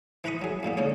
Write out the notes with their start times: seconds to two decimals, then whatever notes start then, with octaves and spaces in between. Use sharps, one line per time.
0.24 E3 B4 A#5 B5 C#6 D#6
0.42 F#3 G#4
0.63 E2 A#2 A#3 B3
0.77 D3 A#3 C#4 G#4 C#5